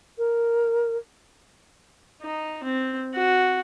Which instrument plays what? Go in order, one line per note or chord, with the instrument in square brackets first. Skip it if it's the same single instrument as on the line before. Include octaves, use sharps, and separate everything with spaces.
[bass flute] A#4
[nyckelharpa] D#4
C4
F#4